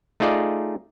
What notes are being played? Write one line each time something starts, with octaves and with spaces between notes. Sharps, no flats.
A3 D#4 F4 G#4 D5 D#5